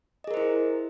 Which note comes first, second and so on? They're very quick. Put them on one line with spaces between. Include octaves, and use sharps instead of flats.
D#5 G#4 A#4 C5 E4